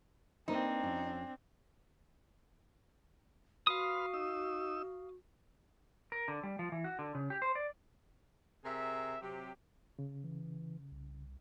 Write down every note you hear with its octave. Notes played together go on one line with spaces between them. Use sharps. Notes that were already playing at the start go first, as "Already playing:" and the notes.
A#3 C4 D4 D#4 B4 C5
F2 C#4
F#4 B4 F5 C6 D#6 F6
D#4 E6
A#4
D3
G3
F3
E3
F#4
D3
C#3
G4
C5
D5
C3 G#4 A#4 E5
C3 F#3 G4
C#3
E3
C2